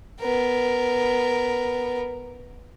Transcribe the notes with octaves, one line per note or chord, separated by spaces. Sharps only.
B3 A#4